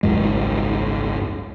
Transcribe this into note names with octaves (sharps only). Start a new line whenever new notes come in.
G#1 C#2 F#2 G#3